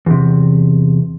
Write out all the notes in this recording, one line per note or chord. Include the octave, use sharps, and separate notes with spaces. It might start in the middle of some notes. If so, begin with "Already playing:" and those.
E2 C3